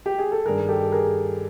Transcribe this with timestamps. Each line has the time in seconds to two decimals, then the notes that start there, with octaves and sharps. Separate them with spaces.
0.06 G4
0.18 G#4
0.32 A4
0.46 G2 D#3 G#4 A#4
0.68 G4 A4
0.92 G#4 A#4